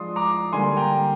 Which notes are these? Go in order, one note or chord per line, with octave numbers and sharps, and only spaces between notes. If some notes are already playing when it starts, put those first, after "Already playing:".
Already playing: F3 G#3 D4 C6 D#6
A#5 D6
D3 G3 A#3 G#5 C6
G5 A#5